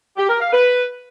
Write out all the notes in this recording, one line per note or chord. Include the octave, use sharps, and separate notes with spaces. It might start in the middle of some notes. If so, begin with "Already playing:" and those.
G4
A#4
F5
B4